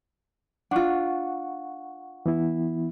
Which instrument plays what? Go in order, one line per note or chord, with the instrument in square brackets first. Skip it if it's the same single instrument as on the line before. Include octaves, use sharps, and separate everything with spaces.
[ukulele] D4 F4 [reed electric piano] F#5 C#6
[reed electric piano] E3 B3 E4